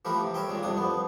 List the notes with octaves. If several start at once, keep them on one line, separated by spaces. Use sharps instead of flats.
E3 F3 A3 G4 A#4 B4
C3
A#4 C#5 E5 G5
A#2 D#3 G#3
C2 F2 C3 D4 D#6
F3 B3